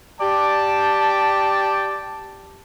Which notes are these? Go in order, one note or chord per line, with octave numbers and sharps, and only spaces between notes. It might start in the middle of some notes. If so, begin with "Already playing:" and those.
G4 D5 G5 A5